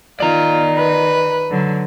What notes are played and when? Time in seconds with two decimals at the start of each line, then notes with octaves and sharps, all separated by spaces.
0.20 D#3 F4 D5 A#5
0.77 B4
1.50 D3 F#3